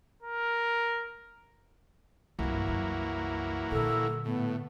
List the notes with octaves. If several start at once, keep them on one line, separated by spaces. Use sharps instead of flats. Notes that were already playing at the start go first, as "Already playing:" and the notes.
A#4
C2 G2 E3 F#3 A#3
C2 F#2
A#2 D3 A4
A2 B3